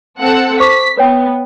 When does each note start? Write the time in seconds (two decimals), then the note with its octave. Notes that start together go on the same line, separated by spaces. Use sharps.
0.20 C4 A4 F#5
0.60 C5 C#6 D6 B6
0.97 B3 B4 C#5 G5